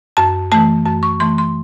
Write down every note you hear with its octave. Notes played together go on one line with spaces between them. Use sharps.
F#2 A5
E3 A3 A5
F#2 A5
C#6
E3 A3 C6
C6